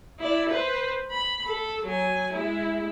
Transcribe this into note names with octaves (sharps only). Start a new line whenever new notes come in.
E4 D5
B4 C5
B5
A4
F#3 G#5
G#3 E4